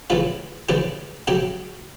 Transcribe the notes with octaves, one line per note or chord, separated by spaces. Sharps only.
C#3 E3 G3 F4 F5
C#3 E3 G3 G4 G5
C#3 F#3 G4 G5